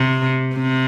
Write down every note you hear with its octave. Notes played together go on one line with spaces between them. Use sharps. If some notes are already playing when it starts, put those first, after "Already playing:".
Already playing: C3
C3